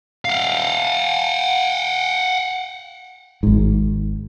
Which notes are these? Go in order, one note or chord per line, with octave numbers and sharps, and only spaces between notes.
F5 F#5
G#1 G#2